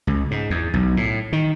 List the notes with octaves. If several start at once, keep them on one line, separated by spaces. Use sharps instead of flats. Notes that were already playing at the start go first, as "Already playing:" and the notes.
C#2
G#2
E2
B1
A2
D#3